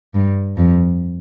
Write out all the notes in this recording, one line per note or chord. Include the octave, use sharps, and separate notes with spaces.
G2
F2